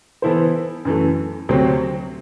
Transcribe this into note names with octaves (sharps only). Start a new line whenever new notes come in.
E3 B3 E4 A4 C5
F#2 E3 A3
D2 C3 F#3 C4